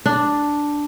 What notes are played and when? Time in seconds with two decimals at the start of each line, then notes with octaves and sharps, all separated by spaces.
0.06 D4